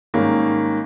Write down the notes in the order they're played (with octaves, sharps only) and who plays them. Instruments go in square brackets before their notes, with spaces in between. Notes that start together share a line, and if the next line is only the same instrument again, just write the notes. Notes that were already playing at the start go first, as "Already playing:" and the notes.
[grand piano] G#2 D#3 G3 A#3 C#4